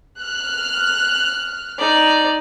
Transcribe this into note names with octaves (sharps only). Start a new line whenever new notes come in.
F6 F#6
D#4 D5